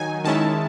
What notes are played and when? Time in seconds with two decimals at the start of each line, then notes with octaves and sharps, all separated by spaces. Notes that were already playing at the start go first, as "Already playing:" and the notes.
Already playing: D#3 F#3 D#4 G#5
0.24 D#3 G#3 C#4 E4 A5